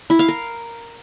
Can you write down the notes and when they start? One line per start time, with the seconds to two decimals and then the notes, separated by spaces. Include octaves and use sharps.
0.10 E4
0.19 F5
0.29 A#4